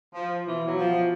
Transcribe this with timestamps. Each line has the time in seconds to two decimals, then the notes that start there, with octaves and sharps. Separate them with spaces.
0.15 F3
0.46 B2 E3
0.66 F#3
0.78 F3